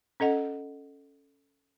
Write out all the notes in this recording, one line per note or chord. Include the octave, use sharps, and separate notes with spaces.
C#4 A4 D#5 F#5